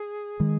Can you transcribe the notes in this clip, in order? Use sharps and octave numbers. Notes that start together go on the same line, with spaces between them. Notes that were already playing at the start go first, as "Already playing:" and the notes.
Already playing: G#4
D#3 G#3